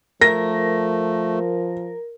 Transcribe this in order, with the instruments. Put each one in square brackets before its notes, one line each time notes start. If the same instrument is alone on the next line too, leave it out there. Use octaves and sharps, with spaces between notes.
[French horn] F3 [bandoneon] A3 [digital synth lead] A#4 [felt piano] A#6